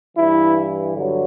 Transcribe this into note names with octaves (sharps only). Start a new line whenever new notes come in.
G2 E3 E4
G2 D3 F#3